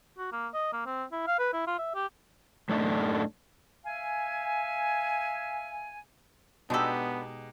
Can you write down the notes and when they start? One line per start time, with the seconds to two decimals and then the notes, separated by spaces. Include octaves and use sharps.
0.18 F#4
0.32 A#3
0.54 D#5
0.73 A#3
0.86 C4
1.12 E4
1.27 F5
1.39 B4
1.53 E4
1.67 F4
1.78 E5
1.95 G4
2.69 F#2 A2 A3 D4 D#4
3.85 E5 F5 G#5
6.70 B2 G#3 B3 D4 D#4 G4 A4